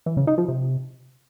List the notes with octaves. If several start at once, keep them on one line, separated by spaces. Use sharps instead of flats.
E3
C#3
D#4
F3
C3